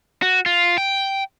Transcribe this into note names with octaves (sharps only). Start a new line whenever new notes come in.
F#4
F4
G5